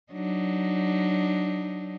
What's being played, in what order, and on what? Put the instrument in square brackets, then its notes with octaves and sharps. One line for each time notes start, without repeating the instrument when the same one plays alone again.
[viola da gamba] F#3 D4 D#4